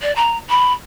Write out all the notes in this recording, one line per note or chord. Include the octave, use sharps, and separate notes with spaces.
D5
A#5
B5